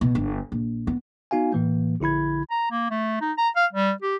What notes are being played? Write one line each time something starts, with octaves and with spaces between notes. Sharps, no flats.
B2
G1
A#1
B3
B3 D#4 F#4 F5 G#5
A2 E3 A#3
A#1 D3 E4 B5 G#6
A#5
A#3
A3
D#4
A#5
F5
G3
G4